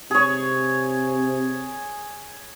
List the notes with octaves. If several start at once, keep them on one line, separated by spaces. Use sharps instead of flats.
C3 G#4 C#5